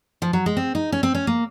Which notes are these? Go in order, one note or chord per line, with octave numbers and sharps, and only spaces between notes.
F3
F#3
G#3
C4
D#4
C#4
C4
C#4
A#3